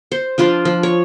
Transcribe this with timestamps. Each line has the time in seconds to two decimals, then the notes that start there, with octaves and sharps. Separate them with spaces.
0.12 C5
0.38 F3 D4 F4 C6
0.65 F3
0.83 C#5